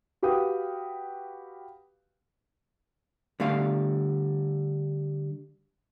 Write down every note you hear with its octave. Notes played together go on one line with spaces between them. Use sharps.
F#4 G4 B4 F5 G5 D#6
D3 G3 A3 F5